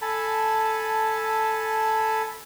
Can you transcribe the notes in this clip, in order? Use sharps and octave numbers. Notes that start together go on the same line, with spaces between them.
A4 G#5 A5 B5